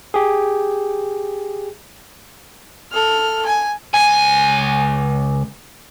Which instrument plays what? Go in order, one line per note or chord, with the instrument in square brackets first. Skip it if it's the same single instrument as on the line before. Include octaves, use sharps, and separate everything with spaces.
[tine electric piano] G4 G#4
[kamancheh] A4 F6
G#5
[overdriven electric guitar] C#2 G#5